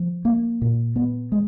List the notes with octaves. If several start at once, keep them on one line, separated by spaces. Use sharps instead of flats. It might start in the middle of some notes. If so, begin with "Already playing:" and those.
Already playing: F3
A#3
A#2
B3
G#3